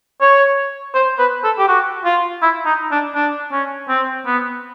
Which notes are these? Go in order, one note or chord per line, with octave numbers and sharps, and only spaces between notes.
C#5
C5
B4
A4
G4
F#4
F4
E4
D#4
D4
D4
C#4
C4
B3